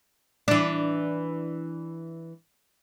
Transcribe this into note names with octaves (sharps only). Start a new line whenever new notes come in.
E3 D4